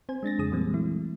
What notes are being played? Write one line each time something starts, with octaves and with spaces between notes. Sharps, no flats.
C4 C5 G#5
G#3 D4 A6 A#6
F2 C#3 G#4 D#6
A#2 E3 G3 G#3 A#3 C4
E3 F#3 A3 E4